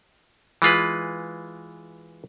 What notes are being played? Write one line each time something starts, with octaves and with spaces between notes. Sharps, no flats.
E3 G#3 F4 B4